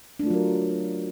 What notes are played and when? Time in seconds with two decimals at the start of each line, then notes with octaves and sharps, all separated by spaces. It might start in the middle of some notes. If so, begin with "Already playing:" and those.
0.19 D4
0.23 A3
0.27 F4
0.30 F#3
0.34 A#4